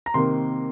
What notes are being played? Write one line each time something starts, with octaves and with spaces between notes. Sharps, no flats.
A#5
C3 D#3 A#3 C6